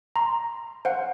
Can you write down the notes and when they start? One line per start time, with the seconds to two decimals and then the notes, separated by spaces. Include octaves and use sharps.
0.16 A#5 C6
0.85 C5 F5 F#5